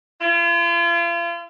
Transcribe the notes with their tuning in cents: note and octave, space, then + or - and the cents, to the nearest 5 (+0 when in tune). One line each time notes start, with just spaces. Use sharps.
F4 -40